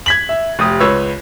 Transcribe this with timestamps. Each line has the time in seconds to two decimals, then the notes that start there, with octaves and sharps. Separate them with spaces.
0.06 G#6 B6 F#7
0.29 E5
0.59 F1 G4 D#6
0.80 C#2 B4 C#5 E6